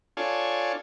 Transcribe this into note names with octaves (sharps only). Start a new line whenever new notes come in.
D4 F4 A4 C#5 G#5